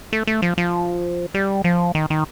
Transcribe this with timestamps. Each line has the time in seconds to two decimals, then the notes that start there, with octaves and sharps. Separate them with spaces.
0.13 A3
0.27 A3
0.42 F3
0.58 F3
1.34 G3
1.64 F3
1.95 D#3
2.10 D#3